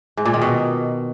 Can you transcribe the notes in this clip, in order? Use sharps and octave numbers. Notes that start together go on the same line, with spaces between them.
G#2
A#2
D#3
B2